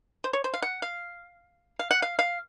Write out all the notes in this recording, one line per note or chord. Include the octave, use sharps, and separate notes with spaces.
C5
C#5
C5
F5
F#5
F5
F5
F#5
F5
F5